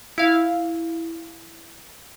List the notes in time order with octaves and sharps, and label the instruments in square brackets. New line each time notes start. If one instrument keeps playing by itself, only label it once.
[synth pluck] E4 F5